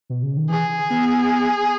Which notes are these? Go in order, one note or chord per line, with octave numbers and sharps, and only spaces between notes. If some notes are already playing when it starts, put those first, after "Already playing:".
B2
C#3
D#3
E3 G#4
B3